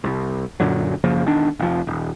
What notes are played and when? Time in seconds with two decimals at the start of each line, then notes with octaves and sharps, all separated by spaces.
0.04 C2
0.60 F#2 A#2 D3 F#3
1.04 F#2 C#3 F3 A#3
1.25 E1 D#3 D4
1.59 F1 F3
1.87 D#1